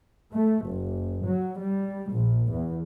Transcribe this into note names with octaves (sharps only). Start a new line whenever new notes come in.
A3
F#1
F#3
G3
A#1
E2